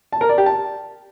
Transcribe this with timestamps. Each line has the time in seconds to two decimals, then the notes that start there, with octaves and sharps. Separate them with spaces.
0.13 A5
0.21 A#4
0.29 D5
0.38 G4
0.46 A5